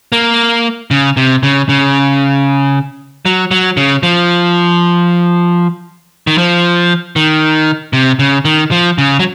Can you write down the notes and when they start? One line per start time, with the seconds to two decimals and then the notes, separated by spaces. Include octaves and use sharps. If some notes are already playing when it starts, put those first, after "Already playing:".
0.12 A#3
0.91 C#3
1.17 C3
1.43 C#3
1.69 C#3
3.25 F#3
3.51 F#3
3.77 C#3
4.03 F3
6.27 D#3
6.38 F3
7.16 D#3
7.93 C3
8.19 C#3
8.45 D#3
8.71 F3
8.98 C#3
9.20 F#3